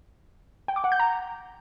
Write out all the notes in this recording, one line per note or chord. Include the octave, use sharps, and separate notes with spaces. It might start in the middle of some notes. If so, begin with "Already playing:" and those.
G5
D6
F#5
G6
A#5